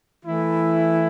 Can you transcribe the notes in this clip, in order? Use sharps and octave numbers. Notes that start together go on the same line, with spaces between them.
E3 A3 E4